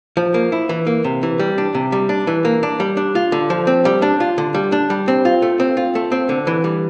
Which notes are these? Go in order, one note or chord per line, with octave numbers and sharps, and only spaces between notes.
F3
A#3
E4
E3
A#3
C3
E3
G3
D4
C3
G3
D4
E3
A#3
D4
G3
D4
F4
D3
F3
C4
G3
D4
F4
D3
G3
D4
G3
C4
F4
A3
C4
F4
A3
C4
D3
E3
G3